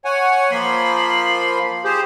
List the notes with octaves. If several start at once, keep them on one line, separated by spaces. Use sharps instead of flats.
C#5 F#5 G#5
F3 A#3 B5 C6
G4 G#4 C5